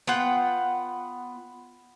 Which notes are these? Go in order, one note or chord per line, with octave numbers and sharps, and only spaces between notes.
B3 F4 F#5 G5